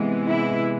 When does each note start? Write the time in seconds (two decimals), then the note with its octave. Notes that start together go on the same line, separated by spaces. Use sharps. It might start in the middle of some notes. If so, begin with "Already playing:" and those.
Already playing: C3 E3 G#3 B3
0.27 E4